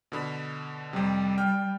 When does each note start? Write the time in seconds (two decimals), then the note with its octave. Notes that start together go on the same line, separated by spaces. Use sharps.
0.12 B2 D3 B5
0.93 F2 C3 G3
1.38 G5 F6